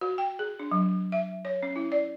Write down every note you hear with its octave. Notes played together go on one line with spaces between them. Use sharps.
F#4
G5
G#4
D4
F#3
E5
C#5
C#4
E4
D5